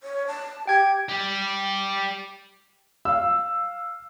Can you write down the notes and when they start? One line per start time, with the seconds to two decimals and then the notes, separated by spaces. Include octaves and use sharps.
0.03 C#5
0.27 A5
0.67 G4 G5 G#6
1.09 G4 D5
3.05 F5 E6